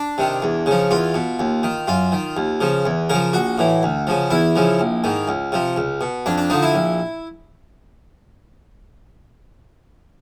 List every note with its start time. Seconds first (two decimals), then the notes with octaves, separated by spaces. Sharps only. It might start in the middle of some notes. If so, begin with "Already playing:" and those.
Already playing: D4
0.18 C3 D#3
0.42 E2
0.66 C#3 F3
0.91 E2 F4
1.14 B2
1.39 D#2
1.63 D#3
1.88 F#2 F4
2.12 D#3
2.37 D#2
2.61 C#3 F3
2.86 E2
3.10 C#3 F3 A#4
3.33 A#1 F#4
3.58 A2 E3
3.83 D2
4.07 C#3 F3
4.30 E2 E4
4.56 C#3 F3
4.80 A#1
5.04 G#2 D#3
5.28 C#2
5.52 C3 F3
5.76 C#2
6.01 B2
6.26 F2 D4
6.38 D4
6.50 D3 F3 D#4
6.62 E4
6.74 A#1